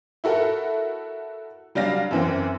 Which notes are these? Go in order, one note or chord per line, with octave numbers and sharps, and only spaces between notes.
E4 F#4 A4 A#4
F#3 G3 D4 F5 A#6
F#2 E3 C4